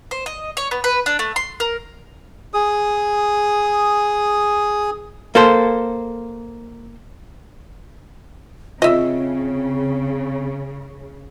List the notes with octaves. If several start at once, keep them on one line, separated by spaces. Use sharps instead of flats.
C5
D#5
C#5
B3
B4
D4
A3
C6
A#4
G#4 D#6
A#3 A4 C5
C#3 C4 F4 D#5 E5